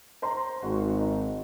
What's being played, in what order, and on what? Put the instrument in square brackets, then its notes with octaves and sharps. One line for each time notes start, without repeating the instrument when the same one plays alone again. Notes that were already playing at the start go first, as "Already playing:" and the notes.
[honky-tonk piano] C5 A#5 C6
[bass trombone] G#1 [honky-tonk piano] F#4
[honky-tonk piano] D#4